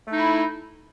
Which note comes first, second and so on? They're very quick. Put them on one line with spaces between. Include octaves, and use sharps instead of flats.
A3 D#4 E4